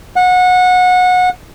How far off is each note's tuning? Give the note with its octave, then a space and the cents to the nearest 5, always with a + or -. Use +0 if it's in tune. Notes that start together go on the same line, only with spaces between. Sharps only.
F#5 -25